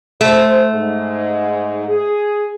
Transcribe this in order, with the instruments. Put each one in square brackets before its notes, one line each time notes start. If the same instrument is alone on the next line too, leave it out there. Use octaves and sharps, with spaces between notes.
[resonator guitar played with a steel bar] A3 [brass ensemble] C5
[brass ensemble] G#2
G#4